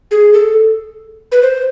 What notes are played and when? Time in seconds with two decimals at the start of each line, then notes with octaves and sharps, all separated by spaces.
0.11 G#4
0.33 A4
1.32 B4
1.42 C5